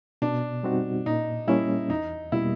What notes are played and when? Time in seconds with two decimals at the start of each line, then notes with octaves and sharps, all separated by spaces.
0.22 B2 D4
0.63 G3 C4 D#4 F#4
1.06 A#2 D#4
1.48 G3 A#3 C#4 E4
1.90 E2 D#4
2.32 B2 G3 A#3 E4